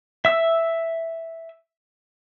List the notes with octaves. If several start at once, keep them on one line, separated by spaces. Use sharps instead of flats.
E5 E6